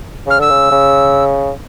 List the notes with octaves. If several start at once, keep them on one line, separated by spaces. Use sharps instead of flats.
C#3 F6
D3 E6
C#3
C#3